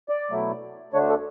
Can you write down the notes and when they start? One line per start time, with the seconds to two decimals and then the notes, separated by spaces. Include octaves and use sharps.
0.09 D5
0.30 B2 F#3 A3 E4
0.93 D2 D3 A3 D4 C#5
1.09 A4